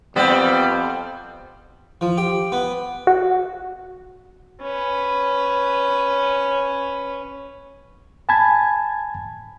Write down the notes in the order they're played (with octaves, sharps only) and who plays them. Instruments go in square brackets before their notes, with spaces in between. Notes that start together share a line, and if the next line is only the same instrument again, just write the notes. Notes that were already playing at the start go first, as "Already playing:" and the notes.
[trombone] F2 [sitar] G3 [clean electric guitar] B3 [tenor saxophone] C4
[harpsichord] F3
G4
B3
[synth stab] F#4
[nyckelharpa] C#4 B4
[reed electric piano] G#5 A5 B5 G#6